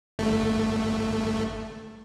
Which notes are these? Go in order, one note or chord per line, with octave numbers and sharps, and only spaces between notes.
G1 A3